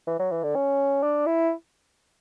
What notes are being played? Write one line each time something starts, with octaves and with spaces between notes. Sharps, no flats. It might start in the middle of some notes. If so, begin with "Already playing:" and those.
E3
F#3
E3
D3
C#4
D4
E4